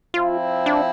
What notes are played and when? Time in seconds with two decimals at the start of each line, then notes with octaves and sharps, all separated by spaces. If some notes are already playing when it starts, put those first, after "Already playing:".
0.14 F3 C4 E4 F4
0.66 D4